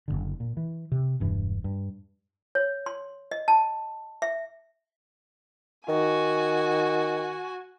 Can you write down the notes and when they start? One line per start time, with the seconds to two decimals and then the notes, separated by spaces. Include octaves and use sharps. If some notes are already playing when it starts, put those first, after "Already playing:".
0.08 F#1 B1 D3
0.40 A#2
0.57 E3
0.92 C3
1.20 E1 G2 E3
1.64 G2
2.55 C#5
2.86 C6
3.31 D#5
3.48 A5
4.22 E5
5.89 D#3 F#4 G#5